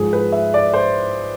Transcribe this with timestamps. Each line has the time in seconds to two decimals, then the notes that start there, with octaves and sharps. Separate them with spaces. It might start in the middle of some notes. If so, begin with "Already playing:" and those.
Already playing: G#2 F3 G#4
0.13 B4
0.32 E5
0.54 D5
0.74 C5